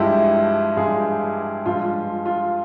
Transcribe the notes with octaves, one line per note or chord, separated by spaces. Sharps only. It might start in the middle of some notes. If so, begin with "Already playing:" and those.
Already playing: G2 F3 G#3 E4 G4
G2 F3 G#3 F4 G#4
G2 F3 G#3 F4
F4